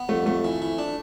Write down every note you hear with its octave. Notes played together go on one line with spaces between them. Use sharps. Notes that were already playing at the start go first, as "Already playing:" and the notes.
Already playing: B3
F2 A3
F2 A3
E3
E3
D4